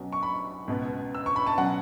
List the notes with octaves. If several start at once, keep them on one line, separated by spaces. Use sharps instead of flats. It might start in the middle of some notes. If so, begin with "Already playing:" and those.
Already playing: B1 B2 F#3 C#4
C#6
B5
C#2 B2 B3
E6
C#6
B5
A5
B2 F#3 C#4 F#5